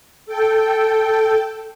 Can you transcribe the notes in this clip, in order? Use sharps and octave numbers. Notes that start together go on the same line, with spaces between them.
A4 G5